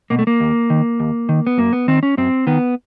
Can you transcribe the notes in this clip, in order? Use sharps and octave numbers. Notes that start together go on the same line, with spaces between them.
B2 A#3
A3
A#3
D#2
D#3
D#2
D#3
B3
F#2 A#3
B3
D#3 C4
C#4
F#2 C4
D#3 B3